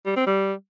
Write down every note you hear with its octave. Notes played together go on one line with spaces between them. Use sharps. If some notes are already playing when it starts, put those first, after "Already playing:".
G3
C4
G3